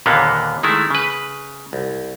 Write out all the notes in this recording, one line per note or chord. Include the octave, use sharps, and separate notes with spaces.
D#2 A#2 D3 A#3 B3
D#3 G#3 A3 E4
C#3 B4
C2